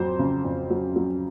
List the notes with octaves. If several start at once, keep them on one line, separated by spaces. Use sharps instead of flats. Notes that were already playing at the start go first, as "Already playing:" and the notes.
Already playing: F2 F#3 C5
C#3
F2
F#3
F#3